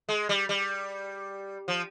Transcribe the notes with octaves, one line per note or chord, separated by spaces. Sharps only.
G#3
G3
G3
F3